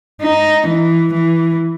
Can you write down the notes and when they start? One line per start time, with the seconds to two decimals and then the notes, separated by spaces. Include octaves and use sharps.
0.22 D#4
0.67 E3
1.13 E3